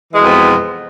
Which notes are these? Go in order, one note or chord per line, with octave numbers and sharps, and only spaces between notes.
F2 B2 E3 G#3 B3